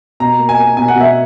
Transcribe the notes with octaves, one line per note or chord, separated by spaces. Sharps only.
B2 A#5
A#3
G#5
A#3
B2 G#5
F#5
B2 E5